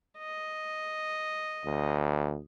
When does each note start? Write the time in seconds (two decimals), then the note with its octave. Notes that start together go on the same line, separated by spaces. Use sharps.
0.19 D#5
1.65 D2